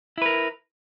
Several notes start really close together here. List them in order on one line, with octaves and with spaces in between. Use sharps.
E4 B4 A#4